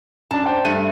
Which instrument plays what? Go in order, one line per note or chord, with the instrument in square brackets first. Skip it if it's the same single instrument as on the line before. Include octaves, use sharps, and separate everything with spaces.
[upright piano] F#2 D4 [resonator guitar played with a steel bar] A5
[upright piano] C5 D5 G5
[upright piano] G2 C#7 D#7 [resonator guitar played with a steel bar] A3